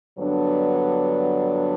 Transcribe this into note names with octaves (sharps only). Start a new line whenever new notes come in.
G2 D3 F#3 B3 D4